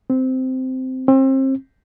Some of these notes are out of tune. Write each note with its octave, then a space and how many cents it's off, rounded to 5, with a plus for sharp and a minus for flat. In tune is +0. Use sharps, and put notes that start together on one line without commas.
C4 -15
C4 +30